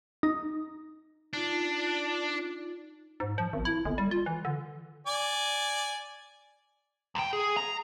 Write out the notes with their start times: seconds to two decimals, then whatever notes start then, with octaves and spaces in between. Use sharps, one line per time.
0.23 D#4
1.33 D4 D#4 F4
3.20 G#2
3.38 F3
3.53 G#1
3.65 E4
3.85 G1
3.98 G3
4.11 F4
4.26 E3
4.45 D3
5.07 D5 G#5
7.15 C2 G5
7.33 G#4
7.57 A#5